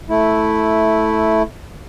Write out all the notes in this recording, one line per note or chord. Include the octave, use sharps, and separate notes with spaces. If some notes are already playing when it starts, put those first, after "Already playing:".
A3 E4